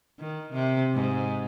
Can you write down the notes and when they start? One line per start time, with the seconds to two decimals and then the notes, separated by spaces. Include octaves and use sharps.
0.19 D#3
0.53 C3
0.94 G#2